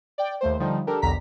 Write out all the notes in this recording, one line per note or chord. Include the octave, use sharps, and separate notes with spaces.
D5 G5
D#2 A3 C5
D3 F3 G3 D#4
D4 G4 A4 A#4
B1 E2 D3 A#5 A#6 B6